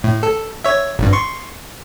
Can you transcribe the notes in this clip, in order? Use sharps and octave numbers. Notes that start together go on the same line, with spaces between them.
A2
A4
C#5 E5
G#1 G2
C6 C#6